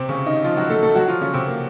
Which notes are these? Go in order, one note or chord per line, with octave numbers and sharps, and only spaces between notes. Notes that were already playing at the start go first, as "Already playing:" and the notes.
Already playing: C3 C4
C#3 C#4
D#3 D#4
F3 F4
F#3 F#4
A3 A4
A3 A4
F#3 F#4
F3 F4
C#3 C#4
C3 C4
A#3